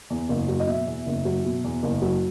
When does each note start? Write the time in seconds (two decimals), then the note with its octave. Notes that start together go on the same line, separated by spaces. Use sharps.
0.10 E2
0.29 F#1
0.48 F#3
0.60 D#5
0.67 B2 E5
0.86 E2
1.07 F#1
1.25 F#3
1.44 B2
1.64 E2
1.83 F#1
2.02 F#3